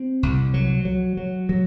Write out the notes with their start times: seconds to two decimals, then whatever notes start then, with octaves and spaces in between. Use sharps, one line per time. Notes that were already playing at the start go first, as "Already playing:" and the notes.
Already playing: C4
0.23 C2
0.54 F#3
0.85 F#3
1.17 F#3
1.49 F#3